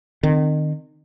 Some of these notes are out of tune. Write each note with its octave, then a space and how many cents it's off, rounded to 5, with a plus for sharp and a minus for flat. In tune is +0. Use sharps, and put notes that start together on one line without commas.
D#3 -30 C4 +0